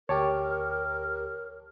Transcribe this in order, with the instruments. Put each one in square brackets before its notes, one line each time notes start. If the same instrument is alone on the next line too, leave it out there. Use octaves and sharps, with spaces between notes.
[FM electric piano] D2 G4 [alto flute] A#4 [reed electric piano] C#5 A5 D6